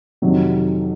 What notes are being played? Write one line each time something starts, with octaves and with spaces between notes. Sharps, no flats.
F2 C3 D#3 F#3